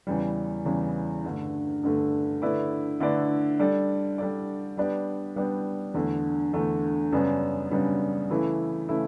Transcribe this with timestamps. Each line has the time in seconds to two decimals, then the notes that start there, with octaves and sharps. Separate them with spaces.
0.07 E2 C#3 E3 G3
0.65 E2 C#3 E3 G3
1.24 G2 D3 A3
1.83 G2 D3 A3
2.42 D3 A3 E4 B4 D5
3.00 D3 A3 E4 B4 D5
3.59 G3 D4 A4 D5
4.18 G3 D4 A4 D5
4.77 G3 B3 D4 G4
5.36 G3 B3 D4 G4
5.94 E2 D3 A3
6.53 E2 D3 A3
7.12 F#2 C#3 G3 B3 D4
7.71 F#2 C#3 G3 B3 D4
8.30 C#3 E3 A3 E4 B4
8.89 C#3 E3 A3 E4 B4